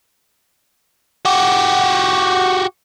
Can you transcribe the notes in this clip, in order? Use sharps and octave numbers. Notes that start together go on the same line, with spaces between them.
F#4 G4